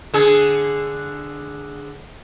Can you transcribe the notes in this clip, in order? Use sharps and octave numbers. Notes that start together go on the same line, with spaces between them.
D3 G#4